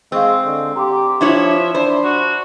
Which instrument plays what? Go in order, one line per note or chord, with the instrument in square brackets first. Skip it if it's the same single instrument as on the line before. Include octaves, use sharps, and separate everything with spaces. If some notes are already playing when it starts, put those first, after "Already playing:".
[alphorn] G#3 [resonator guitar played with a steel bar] C4 [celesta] F5 C#6 E6
[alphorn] D3
[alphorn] G4 [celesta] A#5 C6 D6
[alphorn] F3 [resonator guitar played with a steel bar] D4 E4 C#5 [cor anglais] E5 [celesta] C#6 G#6
[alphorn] D4 [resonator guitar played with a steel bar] C5 [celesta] B5
[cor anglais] F#4